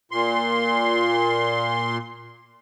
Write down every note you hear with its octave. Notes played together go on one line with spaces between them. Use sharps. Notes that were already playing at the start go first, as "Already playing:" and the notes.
A#2 C6